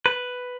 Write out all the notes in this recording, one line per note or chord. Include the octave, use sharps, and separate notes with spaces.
B4